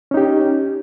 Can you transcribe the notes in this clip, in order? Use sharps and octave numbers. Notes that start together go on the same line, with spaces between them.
C#4 D#4 G4